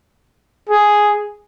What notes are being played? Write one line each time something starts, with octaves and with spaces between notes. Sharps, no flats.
G#4